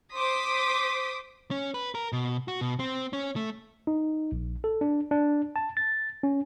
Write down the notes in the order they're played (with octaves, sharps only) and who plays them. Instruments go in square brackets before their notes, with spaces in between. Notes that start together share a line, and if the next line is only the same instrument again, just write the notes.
[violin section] C5 C6 D6 D#6 B6
[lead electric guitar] C#4
B4
A#4
B2
F#4
B2
C4
C#4
A3
[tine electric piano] D#4
A#1
A4
D4
D4
A5
A6
C#4